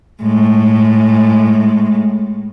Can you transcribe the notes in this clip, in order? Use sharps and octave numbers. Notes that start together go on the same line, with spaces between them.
A2 G#3